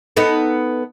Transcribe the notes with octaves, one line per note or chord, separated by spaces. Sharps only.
B3 D#4 A4